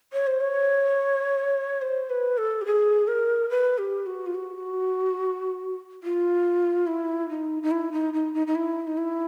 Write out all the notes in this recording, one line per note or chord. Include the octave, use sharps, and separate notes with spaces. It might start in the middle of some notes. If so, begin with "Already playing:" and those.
C#5
C5
C#5
C5
B4
A4
G4
G#4
A#4
B4
G4
F#4
F4
F#4
F4
E4
D#4
D#4
E4
D#4
D#4
D#4
D#4
E4
D#4
E4